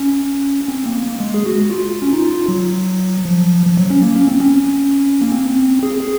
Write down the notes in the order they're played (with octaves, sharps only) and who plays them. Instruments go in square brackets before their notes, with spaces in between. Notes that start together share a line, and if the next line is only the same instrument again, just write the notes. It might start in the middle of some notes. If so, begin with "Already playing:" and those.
Already playing: [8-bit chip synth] C#4
C4
A#3
A#3
G#3
G#4
F#4
F4
C#4
D#4
F4
F#3
F3
F3
F#3
C#4
A#3
C#4
C4
C#4
A#3
C4
G#4
G#4